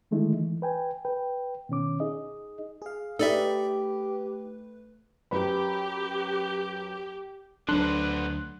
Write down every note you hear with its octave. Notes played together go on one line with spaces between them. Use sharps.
D3 D#3 G#3 A3 D#4 E4
E3
B4 G5 G#5
B4 G5
B2 D#3 C#4 D6
D#4 G#4 D#5
G#4 F5
A3 D#4 G4 A4 B4 D5 E5
F#2 G4 B4 B5
D2 D3 F#3 B3 D4 C6 F#6